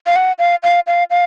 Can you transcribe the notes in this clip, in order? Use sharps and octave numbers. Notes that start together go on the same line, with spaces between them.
F5
F#5
F5
F5
F5
F5